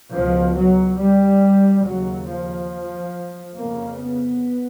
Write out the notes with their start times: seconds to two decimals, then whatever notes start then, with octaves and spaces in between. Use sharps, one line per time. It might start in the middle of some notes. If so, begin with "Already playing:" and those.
0.12 C#2 B2 F3
0.55 F#3
0.98 G3
1.84 D#2 C#3 F#3
2.27 F3
3.56 F2 C#3 A#3
3.99 B3